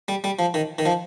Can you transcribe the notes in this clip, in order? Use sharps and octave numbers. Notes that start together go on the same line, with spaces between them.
G3
G3
F3
D#3
D#3
F3